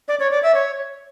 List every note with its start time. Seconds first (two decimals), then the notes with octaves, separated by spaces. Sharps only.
0.08 D5
0.20 C#5
0.31 D5
0.43 E5
0.54 C#5